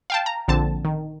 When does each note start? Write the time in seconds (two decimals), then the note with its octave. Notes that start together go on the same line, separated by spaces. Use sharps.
0.10 F5 G5 A5
0.26 A#5
0.48 A#1 D3 C4 A5
0.85 D#3